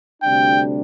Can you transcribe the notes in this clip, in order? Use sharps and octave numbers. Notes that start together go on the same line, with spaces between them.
D2 C3 G3 D4 G5